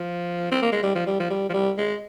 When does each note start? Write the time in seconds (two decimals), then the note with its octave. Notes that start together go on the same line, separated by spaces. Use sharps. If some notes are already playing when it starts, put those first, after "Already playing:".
Already playing: F3
0.52 C4
0.62 A#3
0.72 G#3
0.83 G3
0.95 F3
1.07 G3
1.20 F3
1.30 G3
1.49 F3
1.54 G3
1.78 G#3